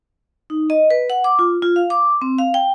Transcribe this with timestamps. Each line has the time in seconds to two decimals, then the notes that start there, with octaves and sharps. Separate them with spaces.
0.50 D#4
0.70 D#5
0.91 B4
1.10 F#5
1.24 D6
1.39 F4
1.62 F4
1.76 F5
1.90 D6
2.22 C4
2.38 F5
2.54 G5